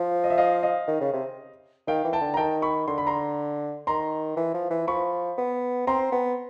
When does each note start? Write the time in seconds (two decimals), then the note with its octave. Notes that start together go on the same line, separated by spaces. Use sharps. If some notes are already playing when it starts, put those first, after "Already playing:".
Already playing: F3
0.24 D#5
0.30 E5
0.38 D#5 F5
0.63 D#5 F5
0.88 D#3
1.01 C#3
1.13 C3
1.87 D#3 F5 G5
2.05 E3
2.13 G5 A5
2.21 D3
2.34 A#5
2.37 D#3 G5 A5
2.62 B5 C#6
2.88 D3 C6
2.98 B5
3.07 A#5 C6
3.87 D#3 A#5 C6
4.37 E3
4.54 F3
4.71 E3
4.87 F3 B5 C#6
5.38 B3
5.87 C4 A#5 C6
6.12 B3